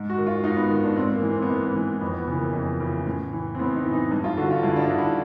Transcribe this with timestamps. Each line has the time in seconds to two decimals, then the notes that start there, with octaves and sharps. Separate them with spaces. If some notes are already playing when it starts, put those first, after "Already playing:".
Already playing: G#2
0.10 F#4
0.17 D#3
0.27 F4
0.44 G#2 D#4
0.57 B3
0.70 D#3
0.84 D4
0.96 G#2 C4
1.15 A#3
1.22 E3
1.32 C4
1.42 B3
1.50 G#2
1.55 A#3
1.66 B3
1.75 E3
2.01 F2 B3
2.18 B3
2.27 C#3
2.32 E3 A#3
2.53 F2
2.80 C#3 E3
3.06 A2
3.33 E3
3.55 C4
3.59 A2 B3
3.76 D#4
3.85 E3
3.93 D#4
4.11 G2 D#4
4.24 F4
4.37 D3 F#4
4.51 F4
4.63 G2 E4
4.76 D4
4.81 D#4
4.90 D3
4.98 E4